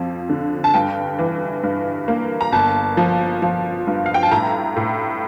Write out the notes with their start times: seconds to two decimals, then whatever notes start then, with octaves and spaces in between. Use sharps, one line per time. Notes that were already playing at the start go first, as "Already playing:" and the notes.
Already playing: F2 F3
0.29 D3
0.64 A5
0.74 G2 G5
1.19 E3
1.63 G2
2.08 A#3
2.41 A#5
2.52 G1 A5
2.97 F3
3.42 F3
3.87 G2
4.06 F5
4.14 G5
4.23 A5
4.31 A2 A#5
4.76 A2